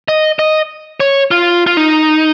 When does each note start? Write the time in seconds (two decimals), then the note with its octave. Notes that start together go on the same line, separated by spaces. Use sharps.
0.08 D#5
0.39 D#5
1.00 C#5
1.31 F4
1.67 F4
1.77 D#4